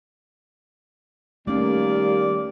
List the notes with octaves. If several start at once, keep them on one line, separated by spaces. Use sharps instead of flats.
D#2 G3 A3 A#3 C#4 D5